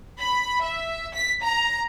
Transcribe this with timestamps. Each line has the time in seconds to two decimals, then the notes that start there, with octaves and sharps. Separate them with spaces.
0.19 B5
0.62 E5
1.14 B6
1.43 A#5